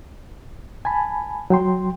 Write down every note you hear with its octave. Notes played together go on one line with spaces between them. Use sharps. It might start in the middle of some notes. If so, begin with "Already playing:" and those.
G#5 A5 B5
F#3 G5 C6